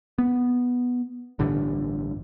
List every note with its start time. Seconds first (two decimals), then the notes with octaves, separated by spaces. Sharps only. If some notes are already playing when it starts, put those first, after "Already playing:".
0.18 B3
1.39 A1 G2 D3